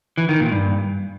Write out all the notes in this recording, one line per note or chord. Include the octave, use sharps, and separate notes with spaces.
E3
D#3
A#2
G2